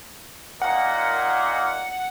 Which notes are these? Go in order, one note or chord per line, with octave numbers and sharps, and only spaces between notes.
A#2 D#3 A#3 F#5